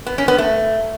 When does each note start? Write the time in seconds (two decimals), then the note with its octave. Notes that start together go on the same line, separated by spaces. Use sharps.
0.06 B3
0.18 C#4
0.28 B3
0.38 A3